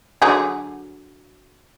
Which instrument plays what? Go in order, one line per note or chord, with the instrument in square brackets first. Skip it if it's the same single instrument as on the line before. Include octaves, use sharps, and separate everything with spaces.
[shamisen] D3 F#3 G#4